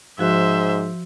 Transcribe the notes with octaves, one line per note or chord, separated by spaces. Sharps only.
G#2 F3 F#4 C5 E5